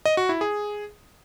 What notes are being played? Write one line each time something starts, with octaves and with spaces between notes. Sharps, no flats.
D#5
F#4
E4
G#4